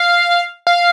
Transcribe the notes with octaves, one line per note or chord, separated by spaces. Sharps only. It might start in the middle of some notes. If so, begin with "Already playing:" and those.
Already playing: F5
F5